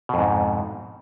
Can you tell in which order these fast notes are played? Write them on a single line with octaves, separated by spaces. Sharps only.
B2 F2 G#2